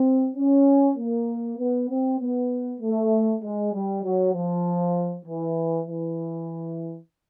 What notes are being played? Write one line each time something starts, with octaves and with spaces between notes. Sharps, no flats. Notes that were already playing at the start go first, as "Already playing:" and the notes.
Already playing: C4
C#4
A#3
B3
C4
B3
A3
G#3
G3
F#3
F3
E3
E3